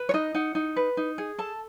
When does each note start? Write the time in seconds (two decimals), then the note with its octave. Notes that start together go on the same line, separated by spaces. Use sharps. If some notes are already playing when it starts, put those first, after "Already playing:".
Already playing: B4
0.09 C#5
0.14 D#4 D#5
0.34 D#4 F#5
0.55 D#4
0.76 B4
0.97 D#4
1.18 G#4
1.38 A4 A5